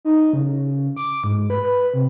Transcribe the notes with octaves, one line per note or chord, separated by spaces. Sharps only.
D#4
C#3
D6
G#2
B4
B4
C3